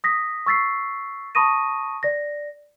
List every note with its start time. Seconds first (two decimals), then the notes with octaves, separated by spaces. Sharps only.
0.04 D#6 A#6 B6
0.46 C#6 E6 A6 B6 C7
1.35 A5 B5 C#6 D#6 A#6 D#7
2.03 D5 A#6